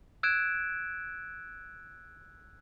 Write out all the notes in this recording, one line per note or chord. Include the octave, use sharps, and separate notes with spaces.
E6 F#6 G#6 D7 E7